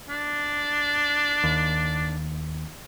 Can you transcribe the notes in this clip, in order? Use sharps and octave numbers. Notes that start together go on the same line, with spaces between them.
D4
D#2